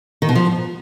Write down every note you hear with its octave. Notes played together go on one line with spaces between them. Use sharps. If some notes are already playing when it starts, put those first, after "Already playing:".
D#3
B2
F3